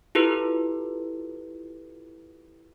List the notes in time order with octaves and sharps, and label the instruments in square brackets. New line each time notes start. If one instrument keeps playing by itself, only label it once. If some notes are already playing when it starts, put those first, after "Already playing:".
[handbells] E4 F4 G4 A4 B4